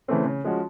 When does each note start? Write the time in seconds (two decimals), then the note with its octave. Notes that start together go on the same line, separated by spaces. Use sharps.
0.08 C#3 E3 A3 C4
0.25 C#3
0.44 F3 G#3 C#4 F#4